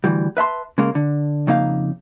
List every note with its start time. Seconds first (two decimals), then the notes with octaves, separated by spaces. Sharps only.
0.04 D2 E3 G3
0.37 B4 E5 A5 C6
0.78 C#3 G#3 A#3
0.95 D3
1.47 F2 C#3 A#3 D#4 F5